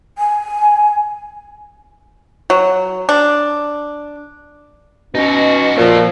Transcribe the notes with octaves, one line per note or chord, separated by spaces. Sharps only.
G#5
F#3
D4
B2 C#4 D#4 F#4
A#2 F3 F4 A4